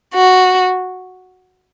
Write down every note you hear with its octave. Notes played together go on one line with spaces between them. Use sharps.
F#4